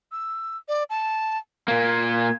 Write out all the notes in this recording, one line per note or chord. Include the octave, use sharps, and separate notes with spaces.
E6
D5
A5
A#2 A#3 G#6